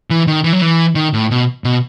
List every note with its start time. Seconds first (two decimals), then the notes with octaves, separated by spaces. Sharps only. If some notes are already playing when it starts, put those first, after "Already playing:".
0.10 E3
0.27 D#3
0.44 E3
0.53 F#3
0.62 E3
0.95 D#3
1.13 A2
1.31 B2
1.64 B2